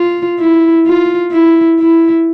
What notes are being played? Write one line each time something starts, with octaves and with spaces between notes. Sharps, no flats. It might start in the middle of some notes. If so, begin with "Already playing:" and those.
Already playing: F4
E4
F4
E4
E4